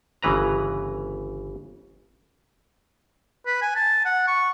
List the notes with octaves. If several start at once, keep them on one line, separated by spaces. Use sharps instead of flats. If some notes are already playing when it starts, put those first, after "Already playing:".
G1 C#3 E3 B4 A#5
B4
G#5
A5
F#5
C#6